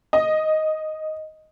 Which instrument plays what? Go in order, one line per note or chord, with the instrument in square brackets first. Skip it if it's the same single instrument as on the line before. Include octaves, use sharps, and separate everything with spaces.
[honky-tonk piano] D#5